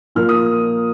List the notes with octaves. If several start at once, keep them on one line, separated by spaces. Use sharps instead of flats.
A#2 F3 A#3 F6
D#6